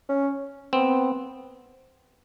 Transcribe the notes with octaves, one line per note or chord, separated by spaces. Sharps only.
C#4
B3 C4